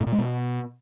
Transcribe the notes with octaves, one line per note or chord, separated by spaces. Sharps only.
A2
A#2
G#3
B2